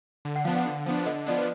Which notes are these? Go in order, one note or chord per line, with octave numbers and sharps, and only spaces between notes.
D3
F#5
F3 B3 D4 F5
F#5
D3
F3 B3 D4
D3 D#5
F3 B3 D4 D5
B4